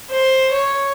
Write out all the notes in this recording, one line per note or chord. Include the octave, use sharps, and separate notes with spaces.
C5
C#5